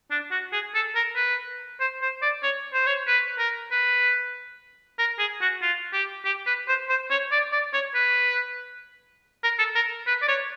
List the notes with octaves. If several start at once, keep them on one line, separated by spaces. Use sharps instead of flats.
D4
F#4
G#4
A4
A#4
B4
C5
C5
D5
C#5
C5
C#5
B4
A#4
B4
A#4
G#4
F#4
F4
G4
G4
B4
C5
C5
C#5
D5
D5
C#5
B4
A#4
A4
A#4
B4
D5
C#5